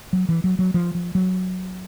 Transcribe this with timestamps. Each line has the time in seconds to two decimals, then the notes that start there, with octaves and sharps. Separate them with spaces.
0.13 F#3
0.29 E3
0.44 F#3
0.59 F#3
0.74 F3
0.95 F3
1.15 F#3